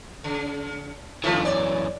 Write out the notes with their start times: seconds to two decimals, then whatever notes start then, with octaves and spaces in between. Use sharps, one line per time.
0.24 C#3
1.24 F#2 D3 E3 F3 A3 F4
1.45 C#5 D5